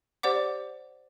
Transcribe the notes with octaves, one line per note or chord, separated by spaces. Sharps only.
G4 C5 D5 F#5 D6